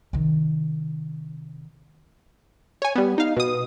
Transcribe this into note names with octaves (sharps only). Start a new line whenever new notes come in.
C3 D#3
C#5 G#5
G3 B3
D#4 F5
B2 D#6